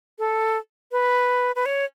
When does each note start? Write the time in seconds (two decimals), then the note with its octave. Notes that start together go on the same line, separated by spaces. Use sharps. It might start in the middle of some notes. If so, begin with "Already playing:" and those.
0.19 A4
0.92 B4
1.56 B4
1.66 C#5